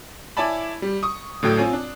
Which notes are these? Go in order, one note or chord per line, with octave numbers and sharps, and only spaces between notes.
E4 C#5 D5 G#5 A5 B5
G3
C#6 D#6
A2 D3 F#3 G5
C4 F4 C#5 G#5
D4